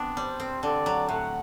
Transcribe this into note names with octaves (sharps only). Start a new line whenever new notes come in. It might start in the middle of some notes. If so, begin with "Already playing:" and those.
Already playing: B3 C4 D4
G3 C5
C4
D3 D5
F#3
A2 F#5